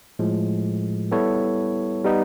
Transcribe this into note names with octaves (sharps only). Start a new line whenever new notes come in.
A2 F3 G#3
G3 B3 E4 A4 C#5
G3 B3 D#4